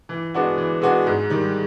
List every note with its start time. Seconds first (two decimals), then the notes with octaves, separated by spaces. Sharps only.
0.09 E3
0.34 G#3 B3 D4 F#4
0.57 E3
0.82 G#3 B3 D4 F#4
1.07 G#2
1.30 D#3 G3